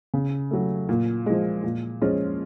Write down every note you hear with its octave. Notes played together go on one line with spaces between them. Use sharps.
C#3
F#3 A3
A#2
F3 G#3
A#2
F3 G#3 C#4 F4